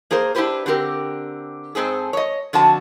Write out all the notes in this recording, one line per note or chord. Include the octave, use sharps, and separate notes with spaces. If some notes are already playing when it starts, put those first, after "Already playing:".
A#3 G#4 A#4 C5
D4 E4 F4 G4 B4 C5
D3 C4 G4 A#4
G#2 C4 G#4 A4
C#5 D#5
F2 D3 F#4 A5